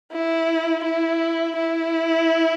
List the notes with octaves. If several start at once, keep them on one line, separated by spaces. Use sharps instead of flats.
E4
E4
E4